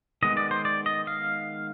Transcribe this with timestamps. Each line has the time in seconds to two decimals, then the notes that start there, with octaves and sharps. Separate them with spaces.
0.22 D#3 G#3 B3 D#5
0.37 D5
0.51 C5
0.65 D5
0.86 D#5
1.07 F5